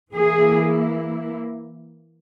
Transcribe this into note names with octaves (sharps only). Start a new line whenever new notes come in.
E3 A#3 E4 G#4